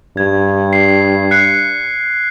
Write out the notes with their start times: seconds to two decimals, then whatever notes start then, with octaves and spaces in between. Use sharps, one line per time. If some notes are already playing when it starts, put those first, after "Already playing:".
0.17 G2 G#6
0.73 C7
1.31 F#6 C7 C#7